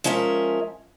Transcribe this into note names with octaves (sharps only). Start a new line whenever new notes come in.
F3 G#3 C#4 A#4 E5